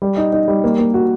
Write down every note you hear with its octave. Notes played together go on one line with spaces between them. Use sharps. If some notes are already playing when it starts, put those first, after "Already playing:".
G3
D#4
D#4
G3
A#3
A#3
F#4